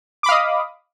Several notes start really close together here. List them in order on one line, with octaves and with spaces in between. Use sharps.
D6 B5 F5 D#5 D#6